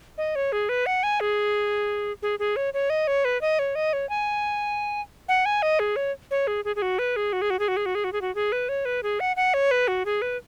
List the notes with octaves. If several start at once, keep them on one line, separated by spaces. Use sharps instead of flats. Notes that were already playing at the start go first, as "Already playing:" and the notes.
D#5
C#5
G#4
B4
F#5
G#5
G#4
G#4
G#4
C#5
C#5
D#5
C#5
B4
D#5
C#5
D#5
C#5
G#5
F#5
G#5
D#5
G#4
C#5
C#5
G#4
G#4
G#4
F#4
B4
G#4
F#4
G#4
F#4
G#4
F#4
G#4
F#4
G#4
F#4
G#4
F#4
G#4
B4
C#5
B4
G#4
F#5
F#5
C#5
B4
F#4
G#4
B4